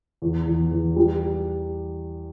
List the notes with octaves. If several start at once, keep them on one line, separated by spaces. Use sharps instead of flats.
E2
E2
E2
G3